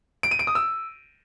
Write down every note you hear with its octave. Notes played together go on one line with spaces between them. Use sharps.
D7
D#7
D7
D#6
E6